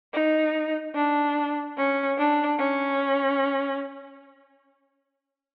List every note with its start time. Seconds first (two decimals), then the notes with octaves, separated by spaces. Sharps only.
0.13 D#4
0.95 D4
1.77 C#4
2.18 D4
2.59 C#4